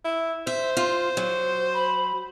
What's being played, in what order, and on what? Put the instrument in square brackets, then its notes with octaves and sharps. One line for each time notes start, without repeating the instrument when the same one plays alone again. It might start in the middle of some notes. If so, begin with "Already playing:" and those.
[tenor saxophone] E4
[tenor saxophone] C5 [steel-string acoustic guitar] E5
[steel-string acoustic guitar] F4
F#3
[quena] B5